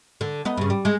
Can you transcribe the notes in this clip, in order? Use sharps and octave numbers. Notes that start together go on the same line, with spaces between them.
D3
B3 D#4
G2 C#3
G3
G#3